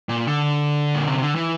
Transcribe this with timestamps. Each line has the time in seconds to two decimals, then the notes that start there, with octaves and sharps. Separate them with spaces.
0.09 A#2
0.27 D3
0.95 A#2
1.07 C3
1.22 D3
1.35 E3